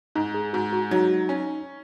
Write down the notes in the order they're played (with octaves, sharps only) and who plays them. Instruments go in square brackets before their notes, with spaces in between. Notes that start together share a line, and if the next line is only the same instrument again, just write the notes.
[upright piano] G#2 [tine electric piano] D#4
[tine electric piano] G#4
[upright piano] G#2 [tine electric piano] F#4
[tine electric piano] F#4
[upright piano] F#3 [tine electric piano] D#4
[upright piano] C#4